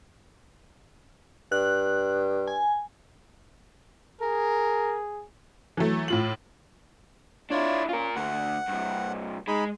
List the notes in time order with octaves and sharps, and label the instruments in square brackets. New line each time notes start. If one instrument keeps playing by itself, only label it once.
[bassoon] G2 [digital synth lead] F#6
[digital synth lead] G#5
[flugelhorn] G#4 [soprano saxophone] A#4
[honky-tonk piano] E3 F#3 A3
A2 F4 F#7
[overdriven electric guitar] D4 E4 [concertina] F4 C#5 D5
[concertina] C#4 [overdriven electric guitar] F4 A#4
[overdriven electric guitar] D2 [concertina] F#5
[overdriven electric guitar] G2 C3
[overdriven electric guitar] G#3 [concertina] D#4 G#4 B5